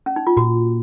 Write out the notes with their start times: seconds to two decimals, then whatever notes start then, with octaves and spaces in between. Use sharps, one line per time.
0.06 C#4
0.16 D#4
0.27 F4
0.37 A#2 F#4